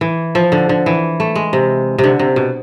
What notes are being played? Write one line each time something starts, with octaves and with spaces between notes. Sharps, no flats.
E3
F3
D3
D3
E3
A3
G#3
C3
C3
D3
C3
B2